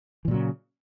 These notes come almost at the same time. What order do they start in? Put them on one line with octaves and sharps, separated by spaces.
E3 A#2 F#3 C#3